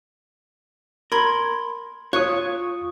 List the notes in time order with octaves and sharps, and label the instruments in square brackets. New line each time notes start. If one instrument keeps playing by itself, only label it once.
[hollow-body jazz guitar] A#4 [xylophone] B5 C6 G#6
[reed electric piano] F4 C#6 D#6 [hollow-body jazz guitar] C#5 [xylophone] F#6